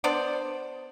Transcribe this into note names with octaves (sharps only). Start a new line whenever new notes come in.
B3 D4 C5 D5